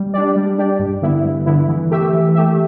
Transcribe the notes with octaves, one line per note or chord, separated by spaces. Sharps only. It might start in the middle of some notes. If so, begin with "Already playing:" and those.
Already playing: G3
D4 G4 D5
G3
D4 G4 D5
G2
D3 B3 E4
G2
D3 B3 E4
E3
A3 G4 E5
E3
A3 G4 E5